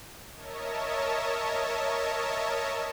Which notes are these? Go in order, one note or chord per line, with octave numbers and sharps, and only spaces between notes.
A#4 C#5 D#5 E5 A5